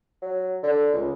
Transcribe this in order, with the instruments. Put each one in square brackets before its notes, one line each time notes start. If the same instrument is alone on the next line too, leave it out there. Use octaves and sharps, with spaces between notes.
[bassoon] F#3
D3
C#2